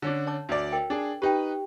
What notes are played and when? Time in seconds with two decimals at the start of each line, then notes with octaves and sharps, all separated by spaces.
0.02 D3 C#4 D4
0.27 C#5 A5 D6
0.49 D2 D5
0.72 A#4 G5
0.90 D4 G#4
1.22 D#4 G4 B4 G5